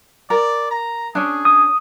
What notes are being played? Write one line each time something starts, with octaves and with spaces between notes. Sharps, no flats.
A#4 D5
A#5
C#4 D4 G#4
D#6